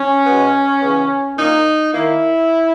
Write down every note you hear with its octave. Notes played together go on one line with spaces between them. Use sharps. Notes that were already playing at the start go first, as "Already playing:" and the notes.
Already playing: C#4
B2 G#3 B3
C#3 E3 B3
A#2 A#3 D#4
D#3 A#3 E4